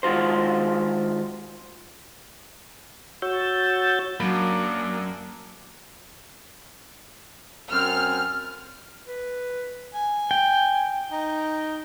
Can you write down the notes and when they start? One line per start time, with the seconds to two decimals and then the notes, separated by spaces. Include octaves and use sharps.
0.03 D#3 G#3 F4 F#4 C5
3.22 F#4 C#5 E6 G6 A6
4.20 F#2 F#3 A#3 D4 B5
7.72 F#2 C4 F6
9.08 B4
9.94 G#5
10.31 G5
11.12 D#4